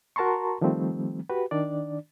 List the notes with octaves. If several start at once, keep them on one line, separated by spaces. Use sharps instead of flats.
F#4 A#4 A5 A#5 C6 C#6
D#3 F3 G3 A3 C4
F#4 G4 B4
D#3 D4 D5